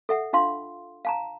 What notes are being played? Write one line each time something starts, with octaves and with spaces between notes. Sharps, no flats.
A4 E5 F#5
D4 F4 F5 C6
F5 A5 A#5